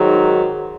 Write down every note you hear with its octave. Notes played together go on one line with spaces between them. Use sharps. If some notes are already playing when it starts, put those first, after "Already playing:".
Already playing: G#2 D#3 F#3